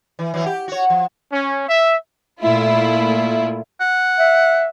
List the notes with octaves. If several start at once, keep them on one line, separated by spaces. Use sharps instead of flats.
E3
E3 F#3
G4
F#4 C#5
F3
C#4
E5
A#2 A3 E4 F4
F#5
E5